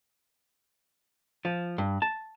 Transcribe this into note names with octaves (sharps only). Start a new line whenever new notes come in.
F3
G2
A5